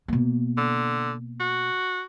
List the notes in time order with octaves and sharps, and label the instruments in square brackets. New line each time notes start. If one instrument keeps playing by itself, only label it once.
[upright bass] B2 A#3
[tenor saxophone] D3
F#4